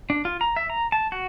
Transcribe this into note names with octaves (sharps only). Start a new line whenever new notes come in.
D4
F4
A#5
E5
A#5
A5
F#4